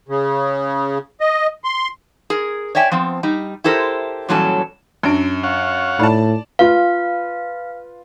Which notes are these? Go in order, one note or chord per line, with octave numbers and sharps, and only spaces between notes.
C#3
D#5
C6
G#4 A#4
C#5 D5 E5 G5 G#5
F3 B3 C4
G3 D#4
E4 G4 A4 A#4 C5
A#2 E3 F#3 G3 C#4 A4
F#2 C#4 D4 D7
C#5 F5 F#5
A2 D#4 D5 A5
F4 B4 F5